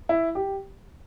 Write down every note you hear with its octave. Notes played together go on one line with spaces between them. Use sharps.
E4
G4